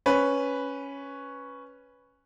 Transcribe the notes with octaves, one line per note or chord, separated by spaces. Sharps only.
C#4 B4